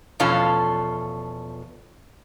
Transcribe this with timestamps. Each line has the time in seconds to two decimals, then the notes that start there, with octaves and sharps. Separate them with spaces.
0.20 E2 B2 F3 C#4 F4 A4